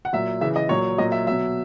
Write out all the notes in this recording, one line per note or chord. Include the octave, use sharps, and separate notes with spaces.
F#5
A#2 F#3 E5
C#3 E3 E5
D#5
A#2 F#3 C#5
A#2 F#3 D#5
E5
B2 F#3 E5